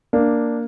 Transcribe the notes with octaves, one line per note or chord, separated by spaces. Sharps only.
A#3 D4